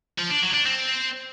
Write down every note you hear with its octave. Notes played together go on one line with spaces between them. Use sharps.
F3
D4
F#3
D4
C4